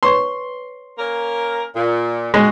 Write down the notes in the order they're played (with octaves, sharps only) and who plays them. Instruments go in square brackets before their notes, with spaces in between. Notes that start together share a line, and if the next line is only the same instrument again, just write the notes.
[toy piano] B4 C#5 C#6 [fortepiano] C6
[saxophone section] A#3 C#4 A#4
A#2
[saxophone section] G3 F#4 [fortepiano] G#3